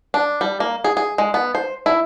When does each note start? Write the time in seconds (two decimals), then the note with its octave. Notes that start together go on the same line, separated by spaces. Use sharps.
0.14 D4
0.41 G3
0.60 A#3
0.84 G#4
0.97 G#4
1.18 G#3
1.34 B3
1.55 C5
1.86 E4